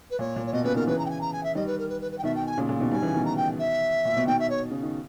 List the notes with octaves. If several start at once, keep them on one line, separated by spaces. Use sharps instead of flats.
B4
A#2 C#5
A#2
C#5
B2 D#5
A#2 C#3 B4
B2 D#3 A#4
C#3 E3 B4
A#5
G5
G#5
A#5
G#5
E5
D#3 G3 D#5
B4
A#4
B4
B4
B4
G5
B2 D#3 E5
G5
G#5
A#2 C#3
A#2 C#3
B2 D#3
D#3 G3 G#5
C#3 E3
B2 D#3
A#5
G5
E5
A#2
B2
B2 D#3 G5
E5
C#5
C#3
D#3